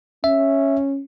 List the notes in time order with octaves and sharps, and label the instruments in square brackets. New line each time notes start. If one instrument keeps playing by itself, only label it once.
[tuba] C#4 [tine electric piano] E5